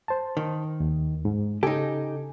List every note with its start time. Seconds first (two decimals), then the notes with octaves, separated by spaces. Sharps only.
0.08 C5 A5
0.37 D#3
0.80 D#2
1.25 G#2
1.63 C#3 D#4 G4 A4 G#5